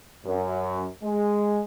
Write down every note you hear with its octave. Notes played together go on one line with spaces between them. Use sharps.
F#2
G#3